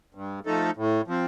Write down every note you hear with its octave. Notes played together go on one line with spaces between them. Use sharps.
G2
F3 A3 D#4 A4
A2
F3 C4